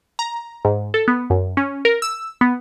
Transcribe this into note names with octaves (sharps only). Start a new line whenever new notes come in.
A#5
G#2
A4
B3
F#2
C#4
A#4
E6
B3